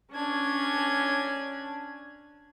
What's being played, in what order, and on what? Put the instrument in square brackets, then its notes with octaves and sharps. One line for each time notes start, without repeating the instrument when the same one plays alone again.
[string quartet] C#4 D4 G#6